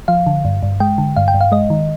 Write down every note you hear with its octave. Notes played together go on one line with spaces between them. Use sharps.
F3 F5
D3
G2
G2
G#3 G5
D3
G2 F5
G5
G2
F5
G#3 D#5
D#3